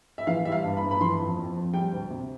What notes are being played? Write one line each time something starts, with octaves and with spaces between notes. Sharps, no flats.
E5
E3 F5
G3 E5
F5
G2
B5
G2
B5
E3 C6
F2
F2
F2
G3 G5
D2
C3